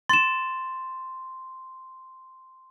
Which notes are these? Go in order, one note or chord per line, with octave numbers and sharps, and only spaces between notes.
C6 A6 E7